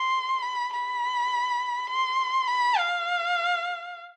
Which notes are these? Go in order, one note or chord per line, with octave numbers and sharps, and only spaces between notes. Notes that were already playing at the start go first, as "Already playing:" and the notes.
Already playing: C6
B5
B5
C6
B5
F5